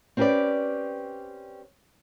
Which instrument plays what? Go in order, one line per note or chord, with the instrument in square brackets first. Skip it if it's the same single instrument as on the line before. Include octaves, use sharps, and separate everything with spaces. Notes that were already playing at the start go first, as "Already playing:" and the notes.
[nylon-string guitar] C4 C#4 G4 A4 B4 D5